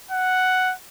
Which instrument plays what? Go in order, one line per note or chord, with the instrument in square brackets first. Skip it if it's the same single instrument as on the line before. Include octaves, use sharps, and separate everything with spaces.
[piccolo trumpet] F#5